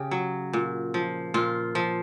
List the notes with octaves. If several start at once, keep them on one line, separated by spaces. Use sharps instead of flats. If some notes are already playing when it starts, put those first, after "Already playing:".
Already playing: C#3 G4
F#3
A#2
F3
A#2 F4
F3